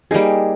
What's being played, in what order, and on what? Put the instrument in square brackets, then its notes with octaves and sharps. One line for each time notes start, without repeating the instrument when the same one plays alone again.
[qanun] G3 A#3 D#4 G#4